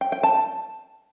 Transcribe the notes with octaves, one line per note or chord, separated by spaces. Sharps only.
G5
G5
A5